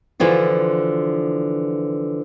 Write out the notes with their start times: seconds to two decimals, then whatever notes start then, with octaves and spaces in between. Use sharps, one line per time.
0.20 D3 E3 F3 F4 F#4